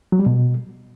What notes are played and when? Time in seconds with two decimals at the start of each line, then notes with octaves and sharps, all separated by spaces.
0.12 F#3
0.19 G3
0.26 B2